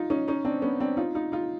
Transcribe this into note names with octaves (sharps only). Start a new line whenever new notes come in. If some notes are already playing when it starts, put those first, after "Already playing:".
Already playing: D#4 F4
C#4 D#4
C#4 D#4
C4 D4
B3 C#4
C4 D4
D#4 F4
D#4 F4
D#4 F4